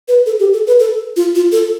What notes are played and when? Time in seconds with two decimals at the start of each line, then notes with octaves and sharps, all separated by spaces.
0.08 B4
0.26 A4
0.40 G4
0.54 A4
0.67 B4
0.80 A4
1.17 F4
1.35 F4
1.52 A4